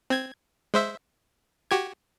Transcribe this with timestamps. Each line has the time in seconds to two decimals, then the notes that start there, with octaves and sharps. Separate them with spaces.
0.10 C4 G#6
0.74 G#3 C5 E5
1.71 F#4 G4 G#6